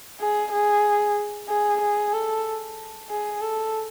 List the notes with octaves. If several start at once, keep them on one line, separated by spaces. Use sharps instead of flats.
G#4
G#4
G#4
G#4
A4
G#4
A4